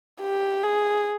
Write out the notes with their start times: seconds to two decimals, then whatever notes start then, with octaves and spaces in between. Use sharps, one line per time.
0.21 G4
0.64 G#4